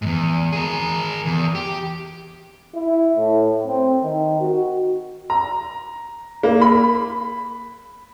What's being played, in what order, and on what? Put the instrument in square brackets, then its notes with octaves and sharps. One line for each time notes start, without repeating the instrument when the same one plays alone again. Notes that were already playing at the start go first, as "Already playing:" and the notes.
[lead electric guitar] E2 G#2
G#4 A#4
E2
G4
[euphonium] E4
A2
C4
D#3
F#4
[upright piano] A#5
A#3
B5